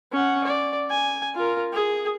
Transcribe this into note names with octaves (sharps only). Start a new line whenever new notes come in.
C#4 F#5
D5
G#5
F4 A#4
G#4